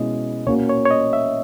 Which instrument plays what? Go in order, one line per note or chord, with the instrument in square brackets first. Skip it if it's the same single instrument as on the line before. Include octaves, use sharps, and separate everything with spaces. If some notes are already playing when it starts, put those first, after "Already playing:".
Already playing: [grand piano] B2 G#3 C#4 E4 [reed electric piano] D#5
[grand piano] A#2 A#3 C#4 F#4 [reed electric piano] C#5
[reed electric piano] C#5
C#5
D#5
E5